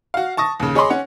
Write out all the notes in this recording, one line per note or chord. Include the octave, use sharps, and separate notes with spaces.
F#4 F5
A5 C#6 D#6 A#6
D#2 C#3
G#4 C#5 D#5 B5 C6 D6
C#4 F#5